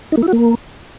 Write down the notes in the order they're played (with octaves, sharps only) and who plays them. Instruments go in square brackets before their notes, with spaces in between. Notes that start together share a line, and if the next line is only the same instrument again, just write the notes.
[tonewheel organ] D#4
A#3
E4
F#4
A#3